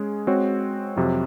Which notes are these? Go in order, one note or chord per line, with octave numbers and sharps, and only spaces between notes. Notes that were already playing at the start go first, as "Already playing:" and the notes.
Already playing: G#3 C#4 G#4
G#3 C4 F#4 C#5
F2 C3 F#3